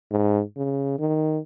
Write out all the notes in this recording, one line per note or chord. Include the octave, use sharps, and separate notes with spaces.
G#2
C#3
D#3